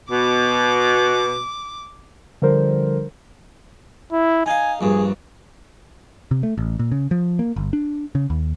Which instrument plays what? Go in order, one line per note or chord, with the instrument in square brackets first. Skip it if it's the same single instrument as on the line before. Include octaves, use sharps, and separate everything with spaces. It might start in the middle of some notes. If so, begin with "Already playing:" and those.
[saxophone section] B2 [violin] D6
[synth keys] D3 F3 G3 A#4 C5
[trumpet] E4
[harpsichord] D#4 F5 [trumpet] G#5
[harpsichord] A#1 G2 [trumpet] G#4
[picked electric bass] C3
A3
A1
A#2
C#3
F3
A#3
G1
D4
C#3
D#2